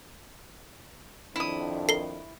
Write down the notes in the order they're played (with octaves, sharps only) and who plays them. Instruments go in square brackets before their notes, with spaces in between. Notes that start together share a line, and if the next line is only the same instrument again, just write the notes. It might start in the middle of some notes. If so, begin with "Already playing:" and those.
[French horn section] F2 D#3 D4 [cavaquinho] E4 D#6
[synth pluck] A4 A#4 [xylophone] C7 G7